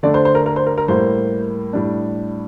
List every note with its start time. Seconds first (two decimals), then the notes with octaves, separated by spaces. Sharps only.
0.03 D3 A3 D4 D5
0.14 C5
0.25 C5
0.35 A#4
0.46 A#4
0.56 C5
0.66 A#4
0.78 A#4
0.88 A2 G3 A#3 C5
1.73 A2 G3 D4